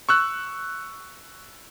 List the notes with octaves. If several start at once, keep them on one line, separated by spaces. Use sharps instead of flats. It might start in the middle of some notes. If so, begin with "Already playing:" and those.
C#6 E6 F#6